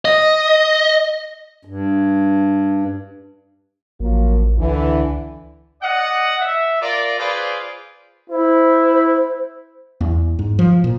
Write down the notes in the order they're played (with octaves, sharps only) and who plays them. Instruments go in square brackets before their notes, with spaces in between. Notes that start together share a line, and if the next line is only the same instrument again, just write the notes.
[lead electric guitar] D#5
[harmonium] G2
[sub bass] A1 [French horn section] F3 F#3 A#3
[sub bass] C#2 [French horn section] D3 E3
[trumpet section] D5 D#5 F#5
E5
F4 A#4 D5
F4 G#4 B4 C5 D5
[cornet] E4 [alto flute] C5
[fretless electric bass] E2
G#2
F3
A#2